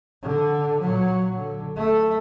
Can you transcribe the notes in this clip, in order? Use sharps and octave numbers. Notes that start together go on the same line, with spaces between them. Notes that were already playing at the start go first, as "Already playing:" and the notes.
D3
A#2 F#3
D3
A3